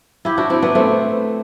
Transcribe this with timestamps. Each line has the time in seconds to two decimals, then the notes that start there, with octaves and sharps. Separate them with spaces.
0.25 E4 G4
0.38 D4 F#4
0.50 C4 E4
0.62 B3 D4
0.75 A3 C4